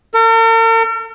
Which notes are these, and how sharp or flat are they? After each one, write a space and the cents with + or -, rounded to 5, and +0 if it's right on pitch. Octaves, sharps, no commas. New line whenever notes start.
A#4 -45